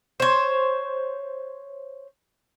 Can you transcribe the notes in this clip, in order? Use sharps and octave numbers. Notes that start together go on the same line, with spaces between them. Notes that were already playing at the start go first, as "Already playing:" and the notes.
C5 C#5